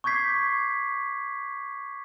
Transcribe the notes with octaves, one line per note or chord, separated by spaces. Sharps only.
C#6 D6 G6 G#6 B6 C7